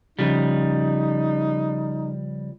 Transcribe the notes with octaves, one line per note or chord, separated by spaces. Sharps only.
C#3 F3 G3 D#4